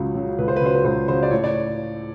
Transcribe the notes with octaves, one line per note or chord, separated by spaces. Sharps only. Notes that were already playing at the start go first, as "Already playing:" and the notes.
Already playing: C#2 C#3 F#3
C#3 F#3
C#2 B4
C5
B4
C#3 F#3 C5
B4
C#2 C5
C#3 F#3 C5
D5
A2 C#5
D5